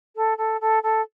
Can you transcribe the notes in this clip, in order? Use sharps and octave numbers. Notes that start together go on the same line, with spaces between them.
A4
A4
A4
A4